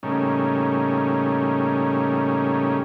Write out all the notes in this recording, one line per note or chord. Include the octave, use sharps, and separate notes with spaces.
A2 C#3 G3 A#3 C#4 D#4